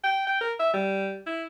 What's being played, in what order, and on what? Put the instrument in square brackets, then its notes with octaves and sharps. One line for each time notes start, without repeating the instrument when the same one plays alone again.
[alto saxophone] G5
G5
A#4
E5
G3
E4